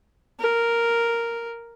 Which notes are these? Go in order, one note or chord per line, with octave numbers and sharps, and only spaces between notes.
A#4